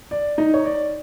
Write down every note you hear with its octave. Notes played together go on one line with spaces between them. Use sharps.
D5
D#4 D#5
C#5
D5